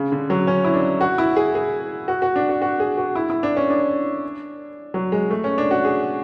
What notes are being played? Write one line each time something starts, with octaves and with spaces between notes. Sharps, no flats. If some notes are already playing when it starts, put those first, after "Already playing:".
Already playing: C#3
D3
F#3
C#4
E4
D4
F#4
E4
G#4
G#4
F#4
F#4
D4
F#4
F#4
G#4
F#4
E4
E4
D4
C#4
D4
F#3
G#3
A3
C#4
D4
F#4
G#4